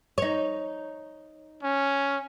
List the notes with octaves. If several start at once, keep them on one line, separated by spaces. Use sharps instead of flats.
D#4 C#5
C#4